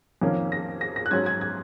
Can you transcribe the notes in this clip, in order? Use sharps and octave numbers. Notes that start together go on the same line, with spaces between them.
F2 D#3 A#3 C#4
A#6
A#6
A#6
F#6
G#2 F#3 C#4 G#6
G#6
G#6